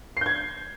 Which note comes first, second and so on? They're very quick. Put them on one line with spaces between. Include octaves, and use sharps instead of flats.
C7 G6 G#6